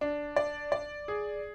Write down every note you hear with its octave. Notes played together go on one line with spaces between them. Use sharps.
D4
D5
D5
G#4